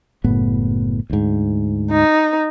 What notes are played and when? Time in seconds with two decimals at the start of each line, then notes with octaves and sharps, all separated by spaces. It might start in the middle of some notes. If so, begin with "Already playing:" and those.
0.24 F#1 A2 B3
1.10 D2 G#2
1.91 D#4